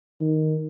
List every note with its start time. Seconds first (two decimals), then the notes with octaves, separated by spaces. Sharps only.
0.21 D#3